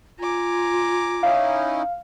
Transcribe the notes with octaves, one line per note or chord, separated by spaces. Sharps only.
F4 G#5 A#5 D6
C#4 D#4 E4 F5